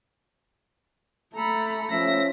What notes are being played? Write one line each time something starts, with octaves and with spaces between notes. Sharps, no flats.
A3 A4 A#5 B5
F3 C#4 E5 A#6